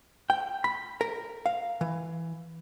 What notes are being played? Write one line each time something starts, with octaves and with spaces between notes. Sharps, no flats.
G5
B5
A#4
F5
E3